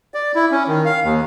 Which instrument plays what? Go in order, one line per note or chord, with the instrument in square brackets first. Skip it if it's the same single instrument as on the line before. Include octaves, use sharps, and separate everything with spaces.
[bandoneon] D5
E4
C#4
D#3
F5
D#2